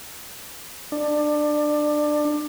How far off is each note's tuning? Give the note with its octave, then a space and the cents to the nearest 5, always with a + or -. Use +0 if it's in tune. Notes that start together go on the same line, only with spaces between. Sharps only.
D4 +20